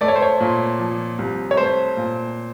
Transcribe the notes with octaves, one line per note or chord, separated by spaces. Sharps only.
A3 D5
C#5
C5
C#5
A#2
F3
C2
C#5
A3 C5
A#2